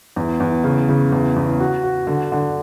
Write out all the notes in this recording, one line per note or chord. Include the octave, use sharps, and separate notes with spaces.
E2
E2
C#3
C#3
E2
E2
F#4
F#4
D3
D3